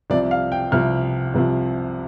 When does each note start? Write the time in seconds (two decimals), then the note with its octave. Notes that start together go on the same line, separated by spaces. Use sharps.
0.10 C2 C3 F3 D5
0.31 F5
0.52 G5
0.72 C2 C3 F3 F6
1.34 C2 C3 F3